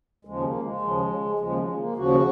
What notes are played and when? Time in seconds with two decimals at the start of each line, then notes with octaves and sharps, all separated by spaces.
0.25 D#2 C#3 F3 G#3
0.44 A#3
0.63 G#3
0.82 D#2 C#3 F3
1.39 D#2 C#3 F3 G#3
1.58 G#3
1.77 A#3
1.96 D#2 C#3 F3 F#4